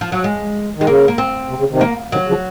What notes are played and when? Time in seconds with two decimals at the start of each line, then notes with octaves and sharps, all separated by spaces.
0.01 F3
0.12 F#3
0.24 G#3
0.76 D#3
0.81 G#3
0.87 C#3 A#3
1.08 A#3
1.18 C4
1.49 C3
1.59 C#3
1.70 C3 D#3
1.81 A#3
2.12 C3 D#3 F#3
2.28 C#3 F3